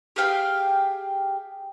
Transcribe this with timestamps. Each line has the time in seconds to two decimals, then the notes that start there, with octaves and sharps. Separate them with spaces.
0.16 G4 G#4 F5 G5